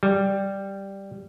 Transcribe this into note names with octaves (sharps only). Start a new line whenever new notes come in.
G3